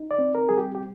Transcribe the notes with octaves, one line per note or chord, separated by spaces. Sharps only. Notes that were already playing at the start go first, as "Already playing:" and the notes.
Already playing: D#4
D5
C4
A#4
G3 G#4
G4
G4